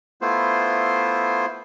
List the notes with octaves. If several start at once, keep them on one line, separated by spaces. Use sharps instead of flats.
A3 B3 E4 F4 C5